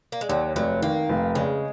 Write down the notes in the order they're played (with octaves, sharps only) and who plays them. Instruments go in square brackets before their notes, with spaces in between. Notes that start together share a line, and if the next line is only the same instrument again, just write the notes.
[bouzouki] A#3
G#3
[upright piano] D#2 [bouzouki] F#3
[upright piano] F1 [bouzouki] F#3
[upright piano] D#3 [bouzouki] A#3
[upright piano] F1
[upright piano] C#3 [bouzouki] G#3